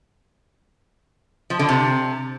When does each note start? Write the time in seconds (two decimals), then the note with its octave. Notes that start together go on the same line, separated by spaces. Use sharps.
1.50 F3
1.59 D3
1.69 C3